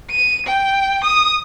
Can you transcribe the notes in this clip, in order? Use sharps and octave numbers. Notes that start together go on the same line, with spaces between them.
D#7
G5
D#6